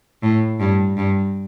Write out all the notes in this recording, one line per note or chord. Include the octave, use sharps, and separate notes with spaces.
A2
G2
G2